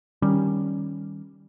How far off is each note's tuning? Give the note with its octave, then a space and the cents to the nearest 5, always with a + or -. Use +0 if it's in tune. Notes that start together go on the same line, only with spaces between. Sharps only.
D#3 +0 G3 +0 C#4 +0